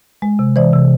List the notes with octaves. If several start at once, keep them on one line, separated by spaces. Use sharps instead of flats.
G#3
C3
E3 C5 D5
C3